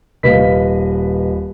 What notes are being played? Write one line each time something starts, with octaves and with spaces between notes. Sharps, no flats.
D#1 B4 D#5 F5 B6